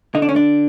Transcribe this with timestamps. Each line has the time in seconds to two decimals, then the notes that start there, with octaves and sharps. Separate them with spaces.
0.15 D3 D#4
0.22 D4
0.29 C#4
0.36 D4